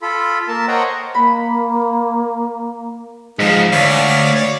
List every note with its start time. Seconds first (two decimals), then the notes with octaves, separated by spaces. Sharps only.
0.02 F4 A4 B5
0.48 A#3 A#4 A5
0.68 C5 C#5 D#5 F#5 G5 A#5
1.14 A#3 B5
3.39 G#2 F3 G#3 D#4
3.72 D2 C#5 D5 F5
4.35 C#5 D5